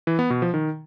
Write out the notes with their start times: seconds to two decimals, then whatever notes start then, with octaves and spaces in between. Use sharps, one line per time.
0.07 E3
0.19 B3
0.30 B2
0.42 F3
0.54 D#3